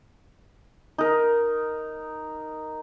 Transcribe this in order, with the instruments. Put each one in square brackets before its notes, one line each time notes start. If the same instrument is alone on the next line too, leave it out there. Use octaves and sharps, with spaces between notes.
[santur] D#4 A#4